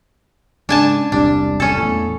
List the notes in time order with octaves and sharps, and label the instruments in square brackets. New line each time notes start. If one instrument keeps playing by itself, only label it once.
[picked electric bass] G#2 C#3 [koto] D4 G#5 A5
[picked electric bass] E1 C2 G3 [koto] D4
[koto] C#4 A4
[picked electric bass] E2 A2